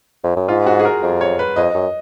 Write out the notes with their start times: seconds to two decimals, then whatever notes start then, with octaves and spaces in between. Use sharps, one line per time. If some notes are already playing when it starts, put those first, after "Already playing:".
0.24 F2
0.36 F#2
0.49 G#2 F4
0.66 F#4
0.79 G#4
0.85 A#4
1.03 F2
1.21 C#5
1.39 B4
1.56 F2 D#5
1.74 F#2